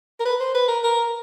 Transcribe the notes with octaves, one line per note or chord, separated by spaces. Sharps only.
A#4
B4
C5
B4
A#4
A#4